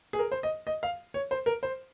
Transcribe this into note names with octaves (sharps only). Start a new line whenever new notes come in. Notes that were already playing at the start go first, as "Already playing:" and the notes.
G#4
A#4
C5
D#5
D#5
F5
C#5
C5
A#4
C5